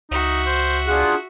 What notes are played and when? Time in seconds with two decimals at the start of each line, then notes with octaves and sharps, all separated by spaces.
0.11 C#2 D#4 F#4 E5
0.47 C5
0.87 D4 F4 G#4 F#5